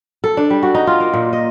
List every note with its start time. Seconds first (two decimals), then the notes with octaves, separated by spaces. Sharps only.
0.24 A4
0.37 D4
0.50 G3
0.63 F#4
0.75 D#4
0.87 F4
1.00 A#3
1.14 A#2
1.33 D#5